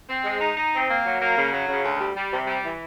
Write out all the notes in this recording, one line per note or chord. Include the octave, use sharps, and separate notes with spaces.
C4
G#3
D#4
D#4
C4
A#3
F#3
A#3
C#3
F#3
C#3
D2
G3
G3
C3
G3
E3